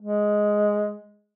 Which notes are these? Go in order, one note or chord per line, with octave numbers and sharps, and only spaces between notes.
G#3